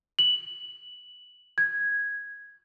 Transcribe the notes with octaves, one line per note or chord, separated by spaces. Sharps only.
F#7
G#6